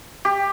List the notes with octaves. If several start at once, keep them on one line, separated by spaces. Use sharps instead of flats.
G4